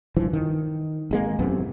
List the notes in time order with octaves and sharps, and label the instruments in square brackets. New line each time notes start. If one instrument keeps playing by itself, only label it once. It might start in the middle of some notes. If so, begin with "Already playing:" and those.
[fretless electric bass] G2 E3 F3
D#3
G#1 G#3 A#3
A1 F#2 C3 B3